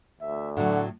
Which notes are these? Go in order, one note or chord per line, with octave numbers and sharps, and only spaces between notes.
D2 E5
A2 D3 F#3 F#5